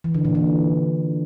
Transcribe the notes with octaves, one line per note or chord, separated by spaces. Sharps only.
E3
D3
A#2
E3